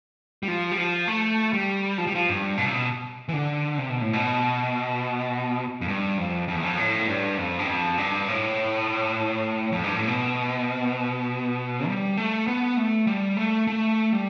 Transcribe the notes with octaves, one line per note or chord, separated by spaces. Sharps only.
G3
F3
G3
F3
A3
G3
F3
G3
F3
G2
B2
C3
B2
E3
D3
C3
B2
A2
B2
F2
G2
F2
F2
E2
F2
A2
G2
F2
G2
F2
G2
A2
F2
G2
A2
B2
G3
A3
B3
A3
G3
A3
A3
G3